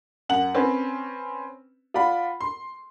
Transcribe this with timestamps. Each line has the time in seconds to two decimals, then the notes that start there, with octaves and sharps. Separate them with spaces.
0.29 F#2 F#5 F#7
0.54 C4 C#4 B4
1.94 F4 D5 F#5 B5
2.41 C6